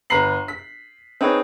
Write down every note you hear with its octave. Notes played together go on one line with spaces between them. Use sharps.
G1 B4 A#5 C7 F#7
B6
C4 D#4 G#4 B4 C#5